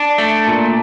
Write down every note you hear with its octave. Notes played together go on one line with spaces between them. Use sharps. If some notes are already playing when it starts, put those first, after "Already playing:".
Already playing: D4
A3
A#2